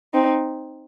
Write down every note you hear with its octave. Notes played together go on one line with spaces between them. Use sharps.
C4 D#4